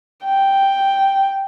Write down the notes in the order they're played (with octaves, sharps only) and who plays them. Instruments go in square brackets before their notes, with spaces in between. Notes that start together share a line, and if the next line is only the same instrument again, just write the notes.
[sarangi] G5